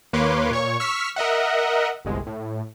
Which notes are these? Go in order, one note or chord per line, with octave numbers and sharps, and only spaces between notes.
D#2 A#3 B4 C#5 C6 D6
A#2 C#5 C#6
C#6 E6 F6 B6
A#4 D#5 E5 F#5
G1 C2 G#3
A2